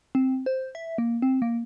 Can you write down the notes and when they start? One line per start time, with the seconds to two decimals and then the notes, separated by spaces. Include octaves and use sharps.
0.15 C4
0.46 C5
0.75 E5
0.98 A#3
1.22 C4
1.42 A#3